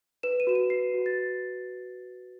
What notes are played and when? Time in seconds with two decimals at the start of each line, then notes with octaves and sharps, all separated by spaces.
0.23 B4 E7
0.40 D#7
0.47 F#4 E7
0.55 D#7
0.70 B4 C7
0.94 F#4
1.06 A6